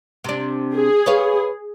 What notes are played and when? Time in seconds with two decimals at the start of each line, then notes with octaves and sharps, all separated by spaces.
0.24 C3 D4
0.75 G#4
1.06 B4 C#5 F5